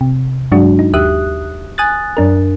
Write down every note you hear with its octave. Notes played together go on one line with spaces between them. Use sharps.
C3
G2 F#3 G#3 D4 F#4
D#4
D#2 G4 E5 D#6 F#6
G#5 D#6 F#6 A6
F#2 D4 A#4